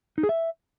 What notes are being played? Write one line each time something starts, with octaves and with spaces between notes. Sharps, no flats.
D#4
G#4
E5